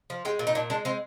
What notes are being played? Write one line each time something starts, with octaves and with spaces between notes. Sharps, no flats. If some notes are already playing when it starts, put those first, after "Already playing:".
F3
G#3 G4
A#2
D#4
A#2 D4
G#3 D4
G#3 C4